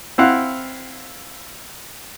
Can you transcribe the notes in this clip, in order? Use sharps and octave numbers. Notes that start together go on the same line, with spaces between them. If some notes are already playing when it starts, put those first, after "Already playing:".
C4 E4 C5 F5 F#5